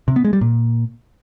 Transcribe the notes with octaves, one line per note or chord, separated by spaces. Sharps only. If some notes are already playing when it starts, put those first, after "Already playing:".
C3
B3
G#3
G3
A#2